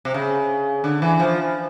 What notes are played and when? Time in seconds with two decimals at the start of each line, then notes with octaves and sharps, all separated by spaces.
0.05 C3
0.14 C#3
0.84 D3
1.02 E3
1.19 F3